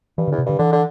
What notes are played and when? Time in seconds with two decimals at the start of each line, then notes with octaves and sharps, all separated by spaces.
0.18 G2 E3
0.28 D3
0.31 E2
0.38 C3
0.46 G2 D3
0.59 D3 E3
0.73 D3